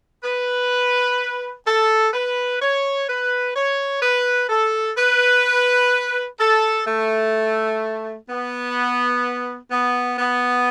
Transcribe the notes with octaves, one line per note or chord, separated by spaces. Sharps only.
B4
A4
B4
C#5
B4
C#5
B4
A4
B4
A4
A3
B3
B3
B3